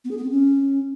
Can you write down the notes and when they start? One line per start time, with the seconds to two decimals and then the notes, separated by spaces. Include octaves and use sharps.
0.04 B3
0.11 G#4
0.17 B3
0.24 C4
0.30 C#4